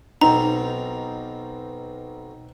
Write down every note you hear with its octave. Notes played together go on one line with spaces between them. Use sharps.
B1 B2 C4 D#4 A#5